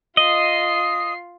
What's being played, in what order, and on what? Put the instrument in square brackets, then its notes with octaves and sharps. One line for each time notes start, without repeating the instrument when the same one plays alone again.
[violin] F4 C7 [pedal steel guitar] D#5